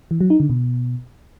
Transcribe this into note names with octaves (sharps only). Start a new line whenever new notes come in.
E3
F#3
D#4
D3
B2